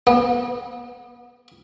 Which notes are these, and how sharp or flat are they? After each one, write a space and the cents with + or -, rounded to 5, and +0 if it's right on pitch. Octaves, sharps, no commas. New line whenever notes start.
B3 -35